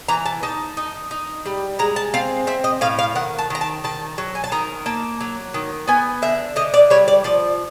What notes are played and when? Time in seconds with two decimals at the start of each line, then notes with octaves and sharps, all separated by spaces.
0.08 E3 A#5
0.25 A5
0.43 D#4 A5
0.77 D#4
1.11 D#4
1.46 G3
1.79 G#3 A#5
1.96 A5
2.14 C4 F5
2.47 C4 E5
2.64 D#5
2.81 A2 F5
2.99 F5
3.15 D#3 F#5
3.39 A5
3.50 D#3 A#5
3.61 A5
3.84 D#3 A5
4.18 F#3
4.35 G#5
4.44 A5
4.52 D#3 A#5
4.86 A#3 A5
5.21 F#3
5.54 D#3
5.88 B3 G#5
6.22 D3 E5
6.56 D3 D#5
6.74 D5
6.90 G3 C#5
7.08 D5
7.24 F3 D5